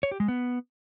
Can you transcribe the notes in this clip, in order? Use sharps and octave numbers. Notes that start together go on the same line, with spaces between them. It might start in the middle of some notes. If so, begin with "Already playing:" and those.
C#5
G4
G#3
B3